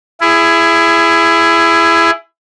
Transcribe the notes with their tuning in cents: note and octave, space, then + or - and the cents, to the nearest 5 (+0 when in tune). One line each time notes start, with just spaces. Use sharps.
E4 +20 G#4 +0